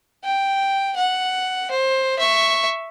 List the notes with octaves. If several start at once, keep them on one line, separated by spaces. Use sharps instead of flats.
G5
F#5
C5
E5 C#6